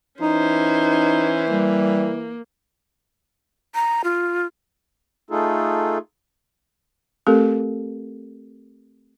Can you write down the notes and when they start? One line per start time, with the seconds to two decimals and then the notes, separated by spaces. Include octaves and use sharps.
0.21 E3 C#4 D#4 C5
1.50 G3 A#3
3.75 A#5
4.04 F4
5.31 A3 D#4 F4 G#4 A4
7.27 A3 C4 G4 A4 A#4